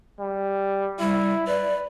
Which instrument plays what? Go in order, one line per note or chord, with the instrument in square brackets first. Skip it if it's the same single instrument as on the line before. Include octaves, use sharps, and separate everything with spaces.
[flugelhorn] G3
[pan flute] G3 [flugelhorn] E4
[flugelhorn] B4 [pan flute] D5